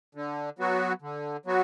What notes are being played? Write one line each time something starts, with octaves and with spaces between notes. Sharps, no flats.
D3
F#3 B3 F#4
D3
F#3 B3 F#4